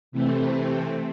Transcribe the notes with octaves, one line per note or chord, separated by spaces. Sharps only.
C3 E3 A3 C4